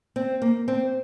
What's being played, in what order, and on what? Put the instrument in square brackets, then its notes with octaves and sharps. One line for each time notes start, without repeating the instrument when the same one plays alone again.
[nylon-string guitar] C4
A#3
C4